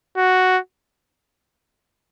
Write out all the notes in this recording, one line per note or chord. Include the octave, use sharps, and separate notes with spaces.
F#4